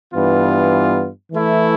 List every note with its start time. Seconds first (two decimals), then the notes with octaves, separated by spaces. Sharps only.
0.11 G2 E3 B3 F4
1.32 E3 A3 E4